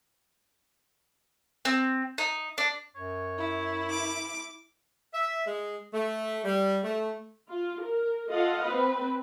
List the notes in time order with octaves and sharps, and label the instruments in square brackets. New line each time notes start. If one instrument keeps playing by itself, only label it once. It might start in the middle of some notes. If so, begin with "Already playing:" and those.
[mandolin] C4
D#4
D4
[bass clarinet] F#2 [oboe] C#5
[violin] E4
[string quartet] D6
[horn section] E5
G#3
A3
G3
A3
[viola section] F4
A#4
F4 A4 D#5 F5 F#5
C4 B4